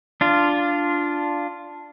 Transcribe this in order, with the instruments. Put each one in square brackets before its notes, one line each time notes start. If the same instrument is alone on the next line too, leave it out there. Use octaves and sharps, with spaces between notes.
[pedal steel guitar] D4 F4